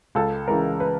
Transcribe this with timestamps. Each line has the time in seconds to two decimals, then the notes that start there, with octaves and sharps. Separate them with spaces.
0.15 C#2 A4
0.48 C#3 E3 G#3 A#4
0.80 B4